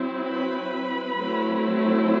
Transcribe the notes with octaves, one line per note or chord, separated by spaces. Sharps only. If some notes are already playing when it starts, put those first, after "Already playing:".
Already playing: F#3 C4 E4
B4 B5
F#3 A3 C4 E4